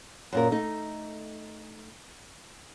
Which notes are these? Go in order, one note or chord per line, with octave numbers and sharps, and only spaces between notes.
F#2 A#2 A#4
A3 D#4